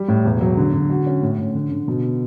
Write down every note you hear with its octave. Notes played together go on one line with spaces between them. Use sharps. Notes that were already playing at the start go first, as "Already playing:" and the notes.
Already playing: G3
A2
E1
F#3
D3
D3
F#4
C#4
A2
A2
D3
D3
B2